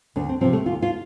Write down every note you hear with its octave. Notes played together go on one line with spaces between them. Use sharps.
D2 D4
C4
C3 F3 C4
A3
D2 F4
F4